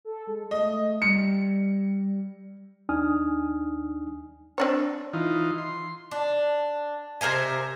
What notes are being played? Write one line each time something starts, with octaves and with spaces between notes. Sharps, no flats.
A4
G#3
A3 D#5
G3 C#7
D#2 D4 D#4 G#5 D#6 F6
C4 D4 C#5
E3 D#4 F4
C6
D4
C3 A#4 C5 G#5